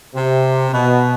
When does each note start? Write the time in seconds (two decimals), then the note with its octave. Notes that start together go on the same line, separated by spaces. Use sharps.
0.15 C3
0.72 B2